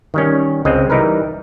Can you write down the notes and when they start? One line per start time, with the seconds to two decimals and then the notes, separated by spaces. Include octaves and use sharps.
0.14 D#3 G3 C#4
0.65 C#2 G#3 C4 D#5
0.90 E3 G3 D#4 A#4 B4